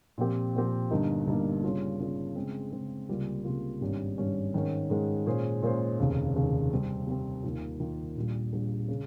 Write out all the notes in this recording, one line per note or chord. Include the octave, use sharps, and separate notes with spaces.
A#2 F3 C4 G4
A#2 F3 C4 G4
G1 G2 G3 A#3 D#4
G1 G2 G3 A#3 D#4
C#3 G3 C#4 F4
C#3 G3 C#4 F4
C#3 G#3 C4
C#3 G#3 C4
C#2 C3 G3 A#3 F4
C#2 C3 G3 A#3 F4
G#1 G2 G3 C#4
G#1 G2 G3 C#4
G#2 D#3 G#3 C#4
G#2 D#3 G#3 C#4
A#2 G#3 C#4 G#4 C5
A#2 G#3 C#4 G#4 C5
F1 D#2 C#3
F1 D#2 C#3
C3 G3 C4
C3 G3 C4
D#2 D#3 A#3 F4
D#2 D#3 A#3 F4
A#1 A#2 G3
A#1 A#2 G3
C#3